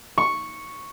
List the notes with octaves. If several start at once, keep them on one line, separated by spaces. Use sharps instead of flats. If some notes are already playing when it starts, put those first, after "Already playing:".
C#6